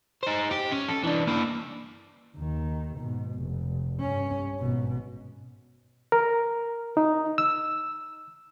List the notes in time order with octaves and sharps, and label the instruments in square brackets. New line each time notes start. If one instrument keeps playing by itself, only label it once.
[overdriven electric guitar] D#4 C5
G4
C#4
A4
E3 D4
A#3 E4
[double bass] D#2 D#3
G#2 B2
F1
G2 C#4
G#1 B2
[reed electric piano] A#4
D#4
E6